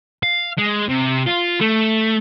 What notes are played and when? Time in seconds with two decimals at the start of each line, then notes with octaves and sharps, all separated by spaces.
0.23 F5
0.58 G#3
0.89 C3
1.27 F4
1.61 A3